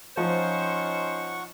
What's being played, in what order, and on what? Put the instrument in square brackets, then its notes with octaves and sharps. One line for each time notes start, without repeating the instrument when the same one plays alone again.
[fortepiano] F3 F4 [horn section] C#4 D#4 C5 [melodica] F#5 C#6